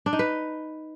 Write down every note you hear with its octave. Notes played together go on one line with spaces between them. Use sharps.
D4
D#4
B4